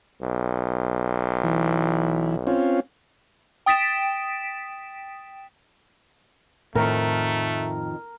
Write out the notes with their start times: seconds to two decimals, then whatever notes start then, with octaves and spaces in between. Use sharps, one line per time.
0.22 B1
1.44 E3
2.47 C4 C#4 F4
3.66 G5 D#6 A6 B6 D7 E7
6.75 F2 A2 D#3 F3 A3 A#4